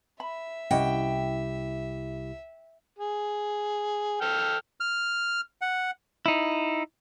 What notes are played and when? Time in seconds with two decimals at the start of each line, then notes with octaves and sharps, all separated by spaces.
0.20 E5 B5
0.71 C2 C#4 E4 G4 D#5 F#5 G5
2.98 G#4
4.21 A4 G5 F6
4.80 F6
5.61 F#5
6.26 D#4 E4